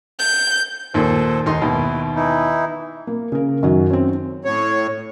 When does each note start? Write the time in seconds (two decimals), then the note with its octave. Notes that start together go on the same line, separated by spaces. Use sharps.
0.19 G6
0.94 D#2 A#2 A4 C5
1.46 D#2 D#4 C6
1.61 D#2 B2 E4
2.16 E3 D#4 E4
3.07 A#3
3.32 C#3 A#4
3.63 F#2 D#3 F#3
3.90 C4 C#4
4.45 A2 C#5